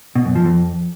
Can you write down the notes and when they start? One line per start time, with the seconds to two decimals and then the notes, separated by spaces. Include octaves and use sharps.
0.16 B2
0.25 F#2
0.35 F3
0.45 F2